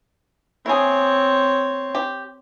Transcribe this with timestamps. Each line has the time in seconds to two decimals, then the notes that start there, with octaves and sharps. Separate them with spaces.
0.66 C4 E4 G#4 C#5
1.95 G4